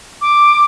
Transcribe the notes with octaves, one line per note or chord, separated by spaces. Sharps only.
D6